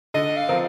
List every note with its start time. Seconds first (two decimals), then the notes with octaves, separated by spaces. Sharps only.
0.14 D3 D#5
0.37 F5
0.48 F3 C4 F4 A#4